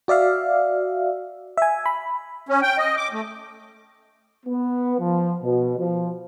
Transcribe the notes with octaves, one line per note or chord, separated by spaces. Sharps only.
F#4 D5 E5 F5
E5 G#5
B5
C#4
G5
D#5
D6
A3
B3
F3
B2
F3